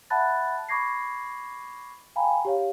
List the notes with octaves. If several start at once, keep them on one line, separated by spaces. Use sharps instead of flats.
E5 F#5 A5 B5 F#6 A6
B5 C#6 D6 G#6 A#6 C7
F5 G5 G#5 A#5 B5
G4 C#5 F5